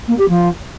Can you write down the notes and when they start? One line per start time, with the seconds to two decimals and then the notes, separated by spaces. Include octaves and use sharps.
0.07 A#3
0.18 G4
0.28 F3